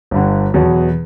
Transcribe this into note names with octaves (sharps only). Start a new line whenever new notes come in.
G1 G2 D3
E2 B2 F#3 B3